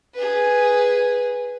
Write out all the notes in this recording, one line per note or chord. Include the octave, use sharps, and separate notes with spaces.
G#4 B4